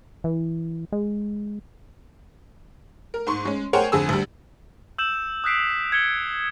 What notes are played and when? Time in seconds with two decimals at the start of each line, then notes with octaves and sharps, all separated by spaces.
0.24 E3
0.92 G#3
3.14 A#4
3.27 G#2 C6 C#6
3.45 G#3 C#4
3.73 G#4 A#4 C5 C#5 F#5 G5
3.92 F2 D3 G#4 E6
4.09 D2 G3
4.98 E6 G6 E7 F#7
5.44 D#6 F#6 G6 B6 C7 D7
5.92 G#6 C#7 G7